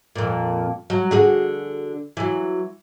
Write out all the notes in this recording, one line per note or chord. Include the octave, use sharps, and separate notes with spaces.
F2 A#2
F#3
D3 F#4 G#4
E3 F#3